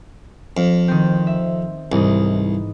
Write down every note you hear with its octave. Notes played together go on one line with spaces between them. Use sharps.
F2
D#3 C4
E5
C2 G#2 E3 D#4